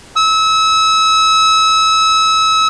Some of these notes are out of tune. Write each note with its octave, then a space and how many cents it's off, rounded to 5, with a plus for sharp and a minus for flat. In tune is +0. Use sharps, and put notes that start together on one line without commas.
E6 -30